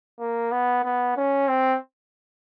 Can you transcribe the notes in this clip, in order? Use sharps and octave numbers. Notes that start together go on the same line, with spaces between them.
A#3
B3
B3
C#4
C4